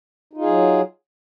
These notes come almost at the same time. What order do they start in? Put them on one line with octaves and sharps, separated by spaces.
D#4 F4 G#4 F#3